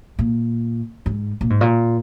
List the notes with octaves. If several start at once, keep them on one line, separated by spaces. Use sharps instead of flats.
A#2
G#2
A#2
G#2
A#2